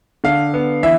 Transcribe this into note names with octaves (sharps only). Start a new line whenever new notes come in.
D3 F5
B3
E3 E5